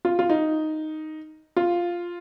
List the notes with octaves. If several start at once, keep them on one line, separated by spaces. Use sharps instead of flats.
F4
F4
D#4
F4